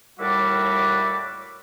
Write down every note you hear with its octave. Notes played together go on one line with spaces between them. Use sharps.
D#2 A2 G3 F#4 E5 D6